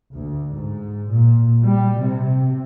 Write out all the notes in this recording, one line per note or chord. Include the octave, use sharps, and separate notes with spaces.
D2
G#2
A#2
G3
C3